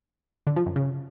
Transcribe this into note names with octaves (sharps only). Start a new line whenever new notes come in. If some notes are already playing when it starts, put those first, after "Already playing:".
D3
F3
F#2
C#3